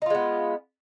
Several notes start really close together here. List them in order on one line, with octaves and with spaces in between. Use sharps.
D#4 F4 G#3 B3